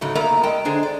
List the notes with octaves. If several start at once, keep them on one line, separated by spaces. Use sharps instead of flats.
G#2 C#3 F#3 A3
A#3 B3 A#4 D5 E5 A#5
G#3 D#5 G5
D3 D4 G#4 C5
D5